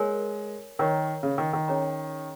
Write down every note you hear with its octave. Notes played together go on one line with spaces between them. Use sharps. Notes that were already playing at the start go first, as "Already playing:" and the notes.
Already playing: G#3 F4 A#4 C#5 G#5
D#3 A#4 C#5 A#5 C#6
C#3
D#3
D#3
C#4 G#4 C#5 A#5